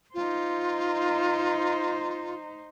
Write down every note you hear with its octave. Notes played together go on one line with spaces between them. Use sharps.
D#4 F4 C5